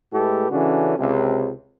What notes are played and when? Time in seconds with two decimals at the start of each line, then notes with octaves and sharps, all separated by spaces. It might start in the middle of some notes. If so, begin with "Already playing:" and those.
0.13 A2 G#3 A3 G4 A4 B4
0.51 C#3 E3 C#4 D4 F#4 A4
0.98 C#2 C3